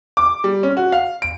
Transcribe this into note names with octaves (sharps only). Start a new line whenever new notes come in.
D6
G3
C#4
F#4
F5
D7